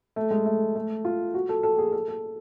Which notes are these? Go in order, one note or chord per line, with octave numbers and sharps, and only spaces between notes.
A3
G#3
A3
A3
F4
F#4
A4
A4
G#4
A4
A4